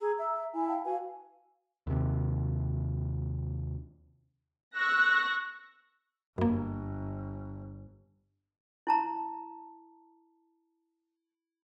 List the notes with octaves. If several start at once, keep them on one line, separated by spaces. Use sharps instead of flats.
G#4 A#5 E6
E5
E4 G#5
F5 G5 A5
F#4 B4 F5 G#5
D#2 C3
C#6 E6 F#6 A#6
G1 F#2 A#3
E4 A5 A#5